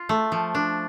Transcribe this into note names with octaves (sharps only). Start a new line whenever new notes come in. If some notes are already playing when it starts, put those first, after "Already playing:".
Already playing: F4
A3
F3
D4